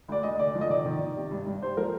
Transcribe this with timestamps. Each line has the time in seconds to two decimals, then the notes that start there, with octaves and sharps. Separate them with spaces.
0.08 D2 D5
0.23 D2 D#5
0.39 D3 D5
0.55 F3
0.61 D#5
0.70 D#3 D5
0.85 D#3
1.01 D#3
1.16 C3
1.31 G2
1.46 G2
1.62 G2 C5
1.77 F3 A#4